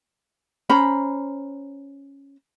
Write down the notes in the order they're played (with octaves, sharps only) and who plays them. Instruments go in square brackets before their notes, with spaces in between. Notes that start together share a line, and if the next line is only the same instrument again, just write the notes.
[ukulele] C#4 C5 A#5 B5